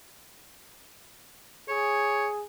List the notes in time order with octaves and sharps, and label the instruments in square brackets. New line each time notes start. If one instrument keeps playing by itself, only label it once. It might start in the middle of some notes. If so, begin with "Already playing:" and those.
[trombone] G#4 [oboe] C#5